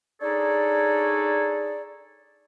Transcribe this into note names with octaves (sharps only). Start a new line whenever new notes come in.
D4 D#4 G#4 A4 C#5 D5